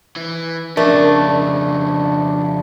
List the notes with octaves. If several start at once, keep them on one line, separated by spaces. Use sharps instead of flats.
E3
F2 C#3 A3 D4 A#4
D4